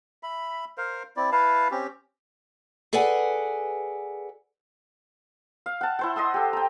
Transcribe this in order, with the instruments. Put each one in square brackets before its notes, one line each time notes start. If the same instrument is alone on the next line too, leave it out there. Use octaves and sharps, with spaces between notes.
[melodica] E5 B5
A#4 C5 F5
C4 E4 D5
E4 B4 F5 A5
C4 C#4 G4
[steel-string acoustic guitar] G#4 A4 B4 D5 F#5 G#5
[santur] F5
F#5 A5
E4 C5 F#5
D#5 C6 D#6 E6
G4 A4
G5 A#5